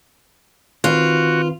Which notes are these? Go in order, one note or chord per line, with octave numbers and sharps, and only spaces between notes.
D#3 C4 F4 F#4 B4